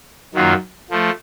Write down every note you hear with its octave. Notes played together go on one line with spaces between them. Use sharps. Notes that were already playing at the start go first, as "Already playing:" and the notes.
F#2 D#3 F#3 A#3 F4
F3 A3